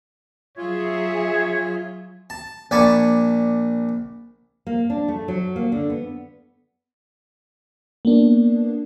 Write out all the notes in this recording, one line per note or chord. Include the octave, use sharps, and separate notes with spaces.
F#3 F4 G#4 C#5 E5
A5
A#1 D5 G#5 A5 B5 C#6
A#3
D4
A3
F#3
A#3
D3
B3
A#3 B3 D4